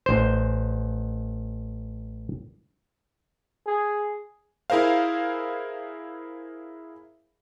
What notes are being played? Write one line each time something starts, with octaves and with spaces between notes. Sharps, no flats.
A1 C5
G#4
E4 G#4 A#4 C5 F5